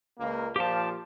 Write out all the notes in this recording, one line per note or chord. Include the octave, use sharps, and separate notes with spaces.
C#2 A#2 A#3
A#2 F3 G4 A5